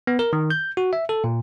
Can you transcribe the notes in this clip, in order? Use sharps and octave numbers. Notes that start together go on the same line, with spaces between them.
B3
A#4
D#3
G6
F#4
E5
A4
A#2